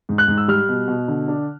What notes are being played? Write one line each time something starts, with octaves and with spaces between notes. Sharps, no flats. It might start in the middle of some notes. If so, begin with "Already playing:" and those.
G#2
F#6
G#2
E6
G3 F6
B2
B2
D3
D4